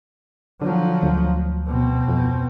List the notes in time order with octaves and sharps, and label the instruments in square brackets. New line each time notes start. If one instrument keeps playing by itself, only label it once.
[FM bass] D3 [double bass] F3 F#3
[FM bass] D2
[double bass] B2 C4
[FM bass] F2